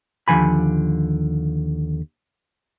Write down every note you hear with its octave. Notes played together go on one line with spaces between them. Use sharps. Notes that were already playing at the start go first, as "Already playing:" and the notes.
D#2 D3 F3 G#5 B5